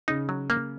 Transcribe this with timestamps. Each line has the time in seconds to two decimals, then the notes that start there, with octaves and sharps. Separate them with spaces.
0.08 C#3 D#4
0.29 F#3
0.50 A#3